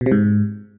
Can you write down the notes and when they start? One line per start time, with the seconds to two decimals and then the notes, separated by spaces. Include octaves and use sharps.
0.01 B2
0.06 C3
0.12 G#2